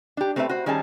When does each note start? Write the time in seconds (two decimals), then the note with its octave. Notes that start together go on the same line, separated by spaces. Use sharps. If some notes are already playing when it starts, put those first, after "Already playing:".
0.17 D4 G4
0.36 A3 C4 G4 A#4 B4 E5
0.49 F#4 C5
0.66 D#3 G3 C#4 G#4 C5 A5